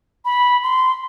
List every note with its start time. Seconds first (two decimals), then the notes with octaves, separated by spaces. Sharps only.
0.25 B5
0.63 C6